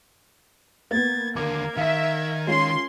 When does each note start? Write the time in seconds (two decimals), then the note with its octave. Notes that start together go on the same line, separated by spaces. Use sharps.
0.91 A#3 B3 G#6 A6
1.36 D#2 D3 A#3 A#4 D6 G#6
1.77 D#3 E5 F5 B6
2.47 G#3 C#4 F4 C6